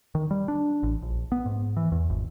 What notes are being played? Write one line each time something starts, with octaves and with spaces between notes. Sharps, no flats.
D#3
G3
D4
A1
A#1
B3
G#2
E3
E2
G#1